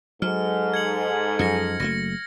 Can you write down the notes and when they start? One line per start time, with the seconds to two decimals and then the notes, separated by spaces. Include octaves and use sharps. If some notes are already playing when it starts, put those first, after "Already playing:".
0.22 G#2 F#3 A4 F6
0.74 G#6 C#7 F#7
1.39 F#2 F3 A#6 C#7
1.80 F#1 F#3 A3 A#6